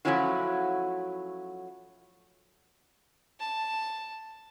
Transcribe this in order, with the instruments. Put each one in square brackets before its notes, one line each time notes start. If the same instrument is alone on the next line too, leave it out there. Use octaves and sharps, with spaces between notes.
[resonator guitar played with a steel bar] F3 F#3 A3 C#4 E4 F#4
[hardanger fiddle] A5